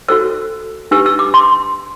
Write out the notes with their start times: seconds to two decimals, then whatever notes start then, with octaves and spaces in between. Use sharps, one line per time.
0.08 F#4 A4 C5 E6
0.91 D4 G4 B4 E6
1.06 E6
1.19 D6
1.34 C6